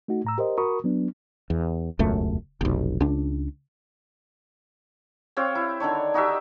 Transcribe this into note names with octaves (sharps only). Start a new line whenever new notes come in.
A3 D#4 F#4
A2 A#5 E6
G4 A#4 C5 D#5
F#4 A#4 B5 C#6 D#6
F#3 B3 D4
E2
E1 C#2 F#2 A3
F1 B1
C#2 D4
C4 C#5 F5 G5
E4
D3 D#3 D4 C#5
D#4 F#4 G4 E5